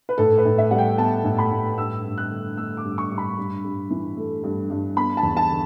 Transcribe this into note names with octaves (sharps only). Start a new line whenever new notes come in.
B4
A2 A4
B4
A2
E5
G3 F#5
G5
B3 A5
A2
B5
A2
G2 E6
G2
F#6
D3
A3 E6
D6
G2
C#6
G2
B5
G2
G2
E3
A3
G2
G2
B3 B5
A5
E2
A5
D3